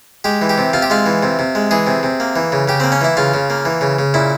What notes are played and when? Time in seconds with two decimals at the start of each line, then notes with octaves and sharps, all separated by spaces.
0.24 G#3 G4
0.41 E3
0.49 G4
0.58 C3
0.73 C3 F4
0.82 G4
0.90 G#3 F4
1.06 E3
1.23 C3
1.39 C3
1.55 G#3
1.71 E3 G#4
1.87 C3
2.03 C3
2.20 A#3
2.36 E3
2.52 C#3
2.68 C#3 G4
2.80 A#3 C4
2.92 C#4
3.01 E3 E4
3.17 C#3 F4
3.34 C#3
3.50 A#3
3.65 E3
3.81 C#3
3.99 C#3
4.14 A#2 E4